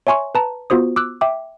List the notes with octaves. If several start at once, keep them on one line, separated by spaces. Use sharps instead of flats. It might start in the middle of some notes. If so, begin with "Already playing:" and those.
C#5 E5 G#5 C6 C#6
B4 A5 A#5
B3 F4 F#4 C5 D#6
D6 E6 F#6
E5 G5 D6